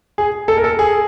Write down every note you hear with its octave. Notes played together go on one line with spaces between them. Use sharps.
G#4
A4
A#4
A4
G#4